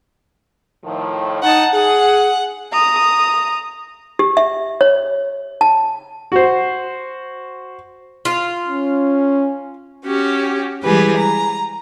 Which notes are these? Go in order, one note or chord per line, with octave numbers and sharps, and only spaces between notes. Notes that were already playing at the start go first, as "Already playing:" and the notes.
A2 D#3 F3
D#4 F#5 A5
G#4 F#5
A#5 D#6
G4
E5
C#5
A5
F#4 C5
F4
C#4
C#4 F#4 G4
E3 G3 G#3 G4 G#4 B4
A#5